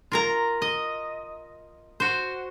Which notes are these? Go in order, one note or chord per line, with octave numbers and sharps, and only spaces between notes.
F4 A#4 A#5
D#5
F#4 C5